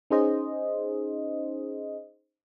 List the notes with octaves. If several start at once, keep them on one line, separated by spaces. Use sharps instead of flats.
C#4 D#4 G#4 C5 D#5